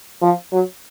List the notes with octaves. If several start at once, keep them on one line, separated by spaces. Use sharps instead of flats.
F3
F#3